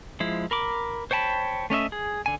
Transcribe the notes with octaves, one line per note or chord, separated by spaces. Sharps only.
F3 G#3 E4
A#4 B5 D6
C5 C#5 G5 A5 B5
A3 C#4 D#5 E5
G#4
D3 G#5